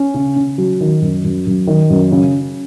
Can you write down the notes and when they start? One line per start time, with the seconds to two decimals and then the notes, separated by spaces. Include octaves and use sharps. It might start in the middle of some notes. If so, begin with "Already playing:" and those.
Already playing: C#4
0.14 C#3
0.36 C#3
0.58 F#3
0.80 D#3
1.02 F#2
1.24 F#2
1.47 F#2
1.67 D#3
1.90 F#2
2.12 C#3